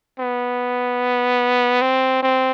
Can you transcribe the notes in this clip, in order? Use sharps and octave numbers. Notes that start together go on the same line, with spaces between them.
B3
C4
C4